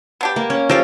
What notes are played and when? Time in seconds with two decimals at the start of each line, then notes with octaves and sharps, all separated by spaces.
0.21 B3 D4 G4
0.36 A#3
0.50 C#4
0.69 F3 D#4 G4 A4 F5